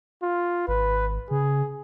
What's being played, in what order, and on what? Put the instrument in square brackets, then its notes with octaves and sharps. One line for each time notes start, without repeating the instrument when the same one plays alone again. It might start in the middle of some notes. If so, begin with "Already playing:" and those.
[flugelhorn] F4
[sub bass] G#1 [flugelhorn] B4
[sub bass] C#3 [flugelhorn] G#4